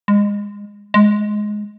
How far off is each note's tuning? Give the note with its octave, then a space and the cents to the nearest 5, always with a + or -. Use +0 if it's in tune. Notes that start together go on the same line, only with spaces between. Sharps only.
G#3 -25
G#3 +10